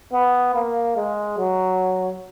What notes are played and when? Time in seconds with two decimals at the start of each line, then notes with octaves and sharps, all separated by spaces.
0.13 B3
0.55 A#3
0.96 G#3
1.38 F#3